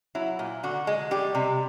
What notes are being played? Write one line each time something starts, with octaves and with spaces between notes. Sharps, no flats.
F#3 E4
A#2
D3 F#4
G#3
G3 G4
C3